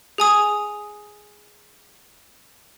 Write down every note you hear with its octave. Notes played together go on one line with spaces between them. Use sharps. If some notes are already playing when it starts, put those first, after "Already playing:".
G#4 G#5 D#6